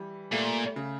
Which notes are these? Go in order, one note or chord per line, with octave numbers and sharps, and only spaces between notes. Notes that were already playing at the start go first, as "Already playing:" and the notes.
Already playing: E3 G3
A#2 A3
C#3